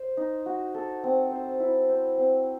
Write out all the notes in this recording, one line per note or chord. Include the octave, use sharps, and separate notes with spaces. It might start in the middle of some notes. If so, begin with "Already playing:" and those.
Already playing: C5
D#4
F#4
A4
C4
C5
E4
C5
C4